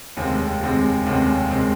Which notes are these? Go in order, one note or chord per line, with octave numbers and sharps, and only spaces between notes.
F1 D#2 C#3 G#3 C4
F1 D#2 C#3 G#3 C4
F1 D#2 C#3 G#3 C4
C#3 G#3 C4